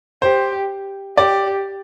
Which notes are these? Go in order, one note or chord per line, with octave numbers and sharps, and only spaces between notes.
G4 C5
G4 D5